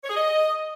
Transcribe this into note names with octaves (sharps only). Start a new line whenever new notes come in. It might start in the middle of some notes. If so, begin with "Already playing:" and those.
C#5
G#4
D#5